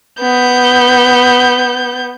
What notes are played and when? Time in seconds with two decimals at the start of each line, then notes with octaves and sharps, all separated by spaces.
0.21 B3 G6